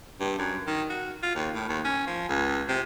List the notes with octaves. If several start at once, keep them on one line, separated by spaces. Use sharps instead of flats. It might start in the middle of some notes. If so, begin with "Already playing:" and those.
G2
F#2
D#3
F#4
F4
D#2
A2
D#2
C#4
F3
C#2
C3